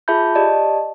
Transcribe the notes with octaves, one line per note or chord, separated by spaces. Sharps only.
F4 G#4 E5 A5 B5 G6
G4 D5 D#5 A5